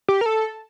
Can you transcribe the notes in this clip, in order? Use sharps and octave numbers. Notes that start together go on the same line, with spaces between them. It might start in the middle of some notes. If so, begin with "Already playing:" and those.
G4
A#4
A4